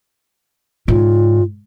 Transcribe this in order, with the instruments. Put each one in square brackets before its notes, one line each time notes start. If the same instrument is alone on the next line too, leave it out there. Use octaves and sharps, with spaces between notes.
[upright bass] G#2 [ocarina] F4